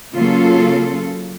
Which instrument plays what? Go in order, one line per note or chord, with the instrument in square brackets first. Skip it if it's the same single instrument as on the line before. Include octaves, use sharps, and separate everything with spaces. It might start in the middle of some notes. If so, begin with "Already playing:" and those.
[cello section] C#3 F#3 A#3 C#4 F4 A4